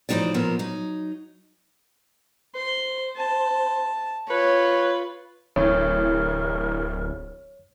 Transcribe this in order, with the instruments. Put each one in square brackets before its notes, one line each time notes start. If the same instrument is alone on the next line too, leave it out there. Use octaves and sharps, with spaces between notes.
[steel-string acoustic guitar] A2 E3 F3 D#4 F#4 D5
A#2 F3 B3 A#4
F#3 D#4
[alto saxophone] C5 [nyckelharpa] C6
[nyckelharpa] A5
[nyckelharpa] F4 [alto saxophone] B4 [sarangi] C#5
[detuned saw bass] D1 [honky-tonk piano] A1 A2 E3 [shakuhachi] A#4 [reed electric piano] C#5